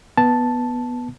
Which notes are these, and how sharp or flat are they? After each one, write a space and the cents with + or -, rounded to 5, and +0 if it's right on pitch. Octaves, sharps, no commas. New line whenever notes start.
B3 -10 A5 +0